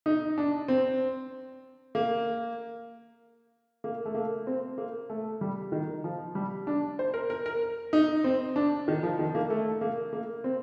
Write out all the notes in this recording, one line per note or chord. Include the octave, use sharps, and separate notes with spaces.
D#4
D4
C4
A#3
A#3
A3
A#3
C4
A#3
A3
G3
D#3
F3
G3
D4
C5
A#4
A#4
A#4
D#4
C4
D4
D#3
F3
D#3
A#3
A3
A#3
A#3
C4